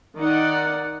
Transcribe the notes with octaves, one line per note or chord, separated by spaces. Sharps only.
D#3 D#4 D5 F#5